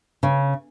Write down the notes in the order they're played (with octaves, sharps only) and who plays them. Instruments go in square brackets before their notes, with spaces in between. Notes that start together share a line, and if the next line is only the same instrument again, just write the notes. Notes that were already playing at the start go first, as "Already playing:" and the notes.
[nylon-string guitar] C#3